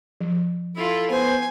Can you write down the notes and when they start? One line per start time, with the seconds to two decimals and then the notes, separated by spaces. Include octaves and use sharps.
0.21 F3
0.76 E4 F4 A4
1.10 B3 C5 G#5